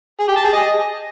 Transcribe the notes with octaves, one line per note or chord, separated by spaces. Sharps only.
G#4
G4
A5
G#4
D#5